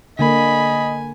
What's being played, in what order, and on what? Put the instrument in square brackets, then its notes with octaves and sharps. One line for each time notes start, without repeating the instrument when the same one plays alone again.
[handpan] D3 A#3 [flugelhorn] D#5 [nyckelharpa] G#5 [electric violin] B5